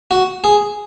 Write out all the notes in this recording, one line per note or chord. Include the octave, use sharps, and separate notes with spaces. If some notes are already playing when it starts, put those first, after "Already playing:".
F#4
G#4